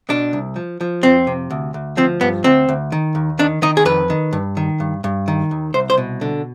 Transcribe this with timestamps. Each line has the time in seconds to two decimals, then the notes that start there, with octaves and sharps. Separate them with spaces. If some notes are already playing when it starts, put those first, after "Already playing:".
0.09 B2 D4
0.33 C2
0.56 F3
0.81 F3
1.03 F2 C4
1.27 C3
1.51 D2
1.74 D2
1.97 F3 C4
2.21 G2 B3
2.44 D2 C4
2.69 D2
2.92 D#3
3.15 D#2
3.39 D#3 D4
3.62 D#3 D#4
3.77 G#4
3.85 F2 B4
4.10 D#3
4.33 G2
4.57 D#3
4.80 G2
5.04 G2
5.28 D#3
5.51 D#2
5.74 C2 C5
5.90 C5
5.98 B2
6.21 D3